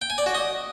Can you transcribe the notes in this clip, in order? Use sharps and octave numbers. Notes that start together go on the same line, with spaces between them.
G5
G#5
D5
F#4
D#5